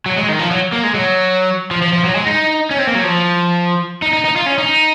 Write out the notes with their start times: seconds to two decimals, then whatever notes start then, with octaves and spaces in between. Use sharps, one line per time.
0.06 F#3
0.18 G#3
0.29 D#3
0.39 F3
0.51 F#3
0.72 A#3
0.83 G#3
0.95 F#3
1.71 F3
1.82 F3
1.93 F3
2.05 F#3
2.16 G#3
2.26 D#4
2.71 C#4
2.79 C4
2.87 A#3
2.95 F#3
3.04 F3
4.02 D#4
4.13 D#4
4.25 D#4
4.36 F4
4.46 C#4
4.58 D#4